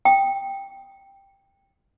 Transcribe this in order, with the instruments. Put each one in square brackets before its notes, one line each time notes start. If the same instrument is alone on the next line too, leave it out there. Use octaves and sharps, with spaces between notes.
[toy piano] G5 D#6